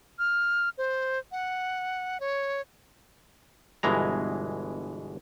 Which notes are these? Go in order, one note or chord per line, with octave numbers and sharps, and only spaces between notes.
F6
C5
F#5
C#5
G1 B2 E3 G#3 A#5